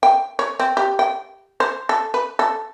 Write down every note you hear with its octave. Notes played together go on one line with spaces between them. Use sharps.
G5
C#5
C4
G4
G5
C5
A4
B4
A4